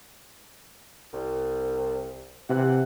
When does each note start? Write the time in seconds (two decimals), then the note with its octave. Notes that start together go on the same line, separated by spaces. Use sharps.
1.13 C2
2.49 C3 E3 F#5